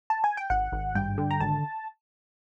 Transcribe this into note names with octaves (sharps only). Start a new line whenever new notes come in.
A5
G#5
G5
G#1 F#5
G#1
G2 G5
D3
A#5
G#1 A5